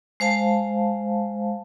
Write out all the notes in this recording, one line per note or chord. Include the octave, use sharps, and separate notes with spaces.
G#3 C5 F5 A5